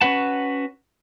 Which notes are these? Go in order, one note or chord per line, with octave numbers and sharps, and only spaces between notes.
C#4 F#4 B4 F#5 A5